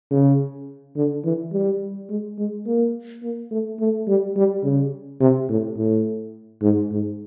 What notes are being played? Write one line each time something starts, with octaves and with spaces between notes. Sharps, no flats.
C#3
D3
E3
G3
G#3
G#3
A#3
A#3
A3
A3
G3
G3
C#3
C3
A2
A2
G#2
G#2